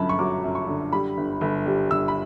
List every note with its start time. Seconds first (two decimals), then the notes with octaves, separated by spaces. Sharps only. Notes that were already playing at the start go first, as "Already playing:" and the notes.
Already playing: G1 F#2 F#3 A5 B5
0.09 C#6
0.19 F#3 D6
0.44 F#2
0.55 C#6
0.67 D3
0.93 G3 B5
1.17 G1
1.41 G1
1.66 G3
1.91 G1 E6
2.08 B5